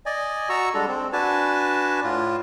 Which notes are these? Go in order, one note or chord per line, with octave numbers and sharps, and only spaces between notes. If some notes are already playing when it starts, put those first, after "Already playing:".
D5 D#5 G#5
F#4 A#5 C#6 E6
G3 G#3 D4 A4
C4
D4 F#4 B4 G#5 A5
A2 F4